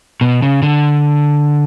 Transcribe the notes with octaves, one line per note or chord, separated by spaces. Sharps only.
B2
C#3
D3